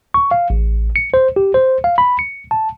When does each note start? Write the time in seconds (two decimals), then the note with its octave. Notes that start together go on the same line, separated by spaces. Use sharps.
0.14 C#6
0.31 F5
0.50 A1
0.96 C#7
1.14 C5
1.36 G4
1.54 C5
1.84 F5
1.98 B5
2.19 C#7
2.51 A5